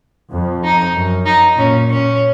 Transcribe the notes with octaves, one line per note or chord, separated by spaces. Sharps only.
F2
D#4
F#2
D#4
A#2 C#4
C#4